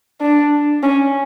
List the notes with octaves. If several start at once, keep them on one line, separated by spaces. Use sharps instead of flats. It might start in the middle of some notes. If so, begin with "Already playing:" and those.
D4
C#4